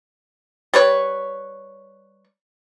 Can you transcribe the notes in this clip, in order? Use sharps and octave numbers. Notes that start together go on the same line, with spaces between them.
G3 B4 C#5